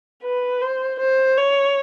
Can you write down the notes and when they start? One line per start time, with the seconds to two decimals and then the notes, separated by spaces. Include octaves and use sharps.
0.24 B4
0.62 C5
1.00 C5
1.37 C#5